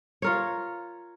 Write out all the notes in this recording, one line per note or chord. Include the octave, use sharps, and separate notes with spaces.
F4 A#4 C#5